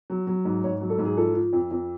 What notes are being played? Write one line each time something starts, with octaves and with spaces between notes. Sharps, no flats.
F#3
F#3
G#2
G#2 C#5
F#3
A4
G#2
G#4
F3 A4
F3
F2
F2